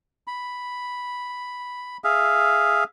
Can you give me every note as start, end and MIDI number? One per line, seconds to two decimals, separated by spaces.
0.27 1.97 83
2.04 2.84 68
2.04 2.84 76
2.04 2.84 77